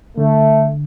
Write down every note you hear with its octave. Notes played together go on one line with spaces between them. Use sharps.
D3 A3